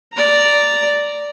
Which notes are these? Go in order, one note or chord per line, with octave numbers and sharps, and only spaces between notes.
D5 A#5